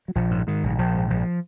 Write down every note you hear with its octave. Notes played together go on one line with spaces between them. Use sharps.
F#3
A#1 F3
G#2
G#2 D#3
A#1
D#3
A#1 F3
G#2
A#1 F3